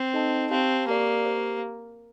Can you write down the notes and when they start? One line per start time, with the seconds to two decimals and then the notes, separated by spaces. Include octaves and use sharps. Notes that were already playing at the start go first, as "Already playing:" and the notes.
Already playing: C4
0.13 D#4 A4 D#5 A5
0.50 C4 G4 C5 F5 A5
0.88 A#3 G4 A#4 D5
1.25 G4 C5 F5